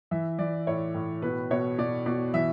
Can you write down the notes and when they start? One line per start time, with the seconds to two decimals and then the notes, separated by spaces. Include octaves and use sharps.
0.11 E3 E5
0.39 E3 D5
0.67 A2 C#5
0.94 A2
1.22 B2 B4
1.51 B2 C#5
1.78 B2 D5
2.06 B2 D5
2.34 E3 E5